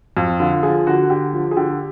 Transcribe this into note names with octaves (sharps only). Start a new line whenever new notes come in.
F2 F4
D3 F4
F3 G#4
D3 F#4
D3 G4
F3
G#4
D3 G4